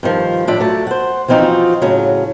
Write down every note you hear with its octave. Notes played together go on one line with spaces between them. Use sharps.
G2 D#3 F3
A2 F3 D4 D5 E5
F#3 A3 A5
C5 F#5
E3 F3 C4 D#4 F4 F#4
A2 C#3 F#3